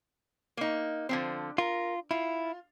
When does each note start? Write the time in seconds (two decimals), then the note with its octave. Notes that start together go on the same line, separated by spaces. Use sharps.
0.57 A#3 D#4
1.09 D3 F3 C4
1.58 F4 A#4
2.11 E4 F4